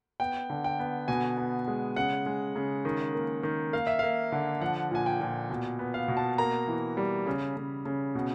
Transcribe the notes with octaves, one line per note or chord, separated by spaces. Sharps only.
B3 G5
D3
G5
B3
B2 G#5
B3
G#3
C#3 F#5
G#3
C#3
D#3
A#3
D#3
A#3 F5
E5
A#3 F5
D3
F3 F#5
A#2 G#5
G5
A#2
B2
B3
F5
B2
A5
A#3 A#5
E3
G3
C#3
C#3
C#3
B2